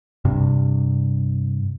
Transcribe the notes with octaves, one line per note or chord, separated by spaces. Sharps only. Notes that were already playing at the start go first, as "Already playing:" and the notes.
G2 C3